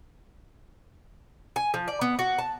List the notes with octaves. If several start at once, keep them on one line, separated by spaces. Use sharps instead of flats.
G#5
F3
D5
B3
F#4
A5